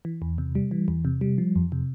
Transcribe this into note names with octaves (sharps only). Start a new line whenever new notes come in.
E3
E2
C3
G3
E3
E2
C3
G3
F3
F2
C3